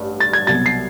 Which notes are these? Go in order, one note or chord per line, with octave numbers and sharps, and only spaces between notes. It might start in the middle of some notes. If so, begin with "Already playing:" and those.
Already playing: A1 G2
A6
G#6
C2 B2 F#3 A6
C7